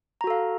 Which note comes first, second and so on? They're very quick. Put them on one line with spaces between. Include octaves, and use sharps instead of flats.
A#5 F#4 A4 F5